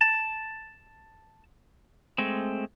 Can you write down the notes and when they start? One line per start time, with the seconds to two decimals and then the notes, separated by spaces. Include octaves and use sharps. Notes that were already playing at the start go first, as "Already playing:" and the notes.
0.01 A5
2.18 G#3 A3 C4